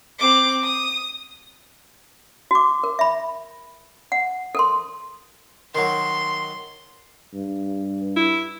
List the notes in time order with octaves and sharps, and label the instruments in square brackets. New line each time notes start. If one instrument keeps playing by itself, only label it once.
[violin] C4 D6
D#6
[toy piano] F#4 D6
A#4
E5 B5
F#5
A4 A#4 C6
[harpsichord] D#3 F#3 [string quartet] C6
[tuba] G2
[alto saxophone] E4